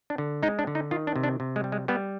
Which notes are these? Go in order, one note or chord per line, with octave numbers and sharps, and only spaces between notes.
D4
D3
G#3 D#4
D4
D3
D#4
D#3 F4
D4
C3
D4
C3
G#3
G3
G#3
G3 B3